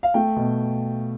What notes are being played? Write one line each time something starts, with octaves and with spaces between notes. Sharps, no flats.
F5
A3 G5
B2